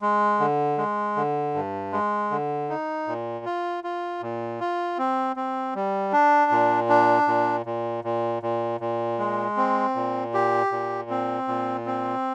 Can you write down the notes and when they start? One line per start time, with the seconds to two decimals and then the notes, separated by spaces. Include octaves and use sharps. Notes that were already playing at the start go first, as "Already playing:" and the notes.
0.02 G#3
0.40 D3
0.78 G#3
1.16 D3
1.54 G2
1.93 G#3
2.31 D3
2.69 D#4
3.08 A#2
3.45 F4
3.84 F4
4.22 A#2
4.60 F4
4.98 C4
5.36 C4
5.75 G3
6.13 D4
6.51 A#2
6.89 D4
7.28 A#2
7.66 A#2
8.04 A#2
8.43 A#2
8.80 A#2
9.19 G#3
9.57 C4
9.95 A#2
10.34 G4
10.72 A#2
11.10 C4
11.48 A#2
11.86 C4